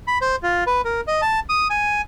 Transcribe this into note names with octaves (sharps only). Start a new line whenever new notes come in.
B5
C5
F4
B4
A#4
D#5
A5
D#6
G#5